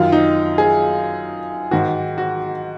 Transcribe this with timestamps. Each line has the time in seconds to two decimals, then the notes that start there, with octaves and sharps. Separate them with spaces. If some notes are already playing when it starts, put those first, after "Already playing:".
Already playing: F#2 D#3 F4
0.12 D#4
0.58 G#4
1.71 G#2 D#3 F#4
2.18 F#4